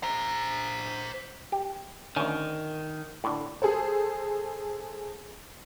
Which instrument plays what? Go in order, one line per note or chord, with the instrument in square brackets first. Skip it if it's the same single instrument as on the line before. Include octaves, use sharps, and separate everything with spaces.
[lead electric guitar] C5 A#5
[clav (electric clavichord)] G4
[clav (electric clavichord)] D2 C#4 [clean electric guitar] D#3
[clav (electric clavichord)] A2 D3
[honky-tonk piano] G#4 A4 C5